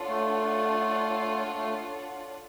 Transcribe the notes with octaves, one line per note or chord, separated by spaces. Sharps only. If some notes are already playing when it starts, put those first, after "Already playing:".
Already playing: D4 F4 A4 C#5 F#5
A3
A3